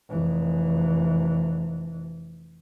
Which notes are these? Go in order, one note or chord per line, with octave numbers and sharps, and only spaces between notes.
F1 E3